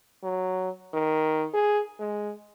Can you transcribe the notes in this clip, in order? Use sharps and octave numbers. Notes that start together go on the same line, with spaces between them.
F#3
D#3
G#4
G#3